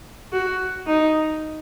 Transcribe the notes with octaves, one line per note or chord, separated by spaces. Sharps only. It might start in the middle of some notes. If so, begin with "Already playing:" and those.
F#4
D#4